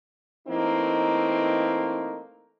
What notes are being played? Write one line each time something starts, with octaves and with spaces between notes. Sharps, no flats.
E3 A3 A#3 C4 D#4